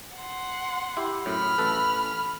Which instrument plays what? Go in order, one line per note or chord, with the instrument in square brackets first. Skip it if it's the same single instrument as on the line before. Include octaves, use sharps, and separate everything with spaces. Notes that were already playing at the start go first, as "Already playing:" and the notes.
[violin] F#5 C6
[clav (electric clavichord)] E4 G4
[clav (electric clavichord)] F#2 A2 [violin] B5 F6
[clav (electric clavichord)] A1 A4 B4